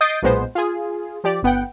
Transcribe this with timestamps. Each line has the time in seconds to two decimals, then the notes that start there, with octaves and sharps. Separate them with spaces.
0.01 D#5 D#6 G6 A6 C7 D7
0.22 B1 A#2 G#3 B3 C5
0.55 F4 G#4
1.24 F3 G4 D5
1.43 G1 B3 F#5 G5